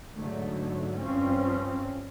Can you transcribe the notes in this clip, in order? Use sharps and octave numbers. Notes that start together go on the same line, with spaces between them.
G#2 D3 F#3 A3
G2 F3 C4 C#4